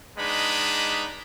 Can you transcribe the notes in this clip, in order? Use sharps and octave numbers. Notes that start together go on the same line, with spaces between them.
G#3 B3 D4 D#4 B5